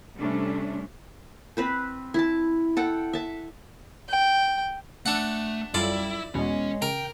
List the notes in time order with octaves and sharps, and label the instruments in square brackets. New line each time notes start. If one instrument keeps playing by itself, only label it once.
[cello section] C3 G3 A3 C#4 D4
[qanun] C4 B4 C5
E4 A5
A4 F#5 G5
E5 A5
[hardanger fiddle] G5
[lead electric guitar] A3 [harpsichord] D4 F#5
[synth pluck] F#2 F4 A4 [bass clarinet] G3 [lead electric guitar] E4 [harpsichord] D5
[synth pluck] E2 B2 E3 [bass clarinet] G#3 [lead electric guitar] C#4
[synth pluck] C#3 [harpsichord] A#4 [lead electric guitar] G5